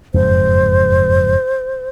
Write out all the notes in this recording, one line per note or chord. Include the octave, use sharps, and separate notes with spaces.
F#1 F2 G#2 C5